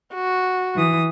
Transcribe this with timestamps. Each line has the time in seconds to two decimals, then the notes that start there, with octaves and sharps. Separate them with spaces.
0.14 F#4
0.75 E3 D#6